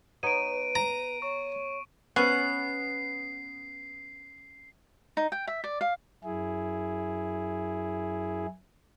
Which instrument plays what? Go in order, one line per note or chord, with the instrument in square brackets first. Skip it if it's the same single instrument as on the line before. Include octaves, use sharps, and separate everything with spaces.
[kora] B3 D#4 C#5 [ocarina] B4 [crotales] D7 D#7
[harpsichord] A#5
[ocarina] C#5 [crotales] C#6
[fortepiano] B3 [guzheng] C#4 [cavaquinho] F#5 [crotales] C7
[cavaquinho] D#4
G5
E5
D5
F5
[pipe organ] F#2 E4 G#4